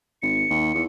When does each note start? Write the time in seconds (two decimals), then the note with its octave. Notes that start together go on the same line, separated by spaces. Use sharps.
0.22 G#1 C#7
0.50 D#2
0.74 E2